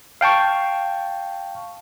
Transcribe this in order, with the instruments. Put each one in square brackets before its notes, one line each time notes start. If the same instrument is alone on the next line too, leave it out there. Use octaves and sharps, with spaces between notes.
[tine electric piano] F5 G5 A5 C#6